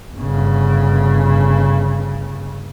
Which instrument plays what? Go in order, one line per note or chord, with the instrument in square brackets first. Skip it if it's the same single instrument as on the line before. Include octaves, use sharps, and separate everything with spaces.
[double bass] G1 C#3